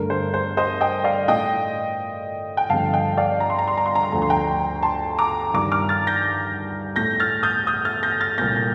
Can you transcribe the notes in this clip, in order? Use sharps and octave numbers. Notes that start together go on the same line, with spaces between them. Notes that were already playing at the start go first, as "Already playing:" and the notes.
Already playing: G2 D3 A3 A#4
C5
C5
C5 D#5
D#5 G5
D5 F5
A2 A3 D#5 G5
G5
G2 D3 F3 A3 F5 A5
D#5 G5
D5 F5
A#5
C6
A#5
C6
A#5
C6
A#5
C6
D2 D3 F3 A3 A#5
C6
G5 A#5
A5 C6
A#5 D6
G2 D#3 G3 A#5 D6
D6 F6
F6 A6
G6 A#6
A2 A3 G6 A#6
F6 A6
D#6 G6
D#6 G6
F6 A6
G6 A#6
F6 A6
C2 A#2 A3 G6 A#6
G6